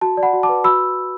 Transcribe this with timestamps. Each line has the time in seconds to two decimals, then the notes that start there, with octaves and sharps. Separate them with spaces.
0.01 F#4 A5
0.17 D5
0.23 F#5 B5
0.33 F#4
0.43 A5 D6
0.49 B4
0.64 F#4 B5 E6